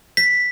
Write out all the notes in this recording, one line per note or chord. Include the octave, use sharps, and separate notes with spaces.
B6